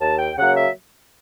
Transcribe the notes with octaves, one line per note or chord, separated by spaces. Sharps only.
D#2 A5
G5
C#3 F#3 A#3 F#5
E5